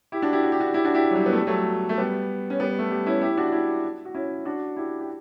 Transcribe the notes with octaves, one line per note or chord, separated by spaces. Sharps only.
E4 G4
D4 F#4
E4 G4
F#4
G4
D4 F#4
E4 G4
D4 F#4
E4 G4
F#3
G3
B3
A3
G3
F#3 A3
A3
G3 B3
C#4
G3 B3
A3
G3
C#4 E4
E4 G4
D4 F#4
E4 G4
F#4
C#4 E4
D4 F#4
E4 G4
G4